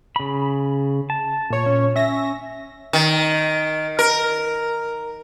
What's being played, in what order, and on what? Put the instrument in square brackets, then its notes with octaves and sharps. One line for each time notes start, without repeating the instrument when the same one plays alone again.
[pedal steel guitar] C#3 B5
A5
[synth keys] A#2 C#5
[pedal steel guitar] C#4
[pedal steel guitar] C#4 [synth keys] E5 A#6
[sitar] D#3
A#4